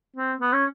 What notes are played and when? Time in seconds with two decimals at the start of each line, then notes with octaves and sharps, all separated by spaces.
0.16 C4
0.41 B3
0.53 C#4